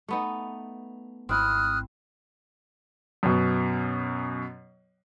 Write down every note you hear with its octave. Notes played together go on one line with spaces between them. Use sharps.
A3 B3 D#4
G#1 C4 E4 D#6 F6 F#6
F#2 B2